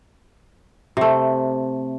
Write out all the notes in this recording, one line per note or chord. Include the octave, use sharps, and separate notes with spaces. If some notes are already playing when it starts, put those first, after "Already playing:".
C3 A3